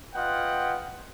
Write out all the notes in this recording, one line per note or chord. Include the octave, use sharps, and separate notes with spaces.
F4 B4 D#5 F#5 G5